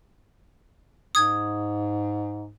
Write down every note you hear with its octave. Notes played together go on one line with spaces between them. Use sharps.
G#2 D#6 G#6